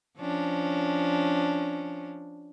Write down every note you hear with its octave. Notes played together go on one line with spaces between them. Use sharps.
F3 C#4 D4